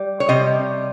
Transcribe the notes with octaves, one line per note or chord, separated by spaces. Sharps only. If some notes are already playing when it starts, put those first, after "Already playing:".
Already playing: G3
C#5
C3 G3 D#5